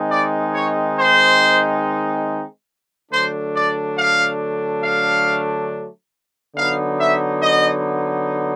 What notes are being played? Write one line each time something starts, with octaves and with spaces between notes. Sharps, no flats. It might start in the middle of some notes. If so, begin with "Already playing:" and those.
Already playing: D#3 G#3 C4 D#4
D5
C#5
C5
D3 F#3 A3 D4 C5
D5
F5
F5
D3 F#3 B3 D#4 F5
E5
D#5